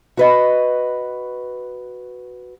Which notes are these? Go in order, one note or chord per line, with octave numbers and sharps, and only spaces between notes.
F#4 B4 D#5